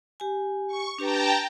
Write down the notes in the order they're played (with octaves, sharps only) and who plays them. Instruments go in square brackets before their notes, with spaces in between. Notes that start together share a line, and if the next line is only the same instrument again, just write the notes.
[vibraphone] G4 G#5
[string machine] C#6
[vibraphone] D4 G4 B4 [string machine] G5 A5 A#5